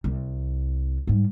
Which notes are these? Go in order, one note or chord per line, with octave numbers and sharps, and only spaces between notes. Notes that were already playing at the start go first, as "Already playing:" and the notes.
C2
G#2 G3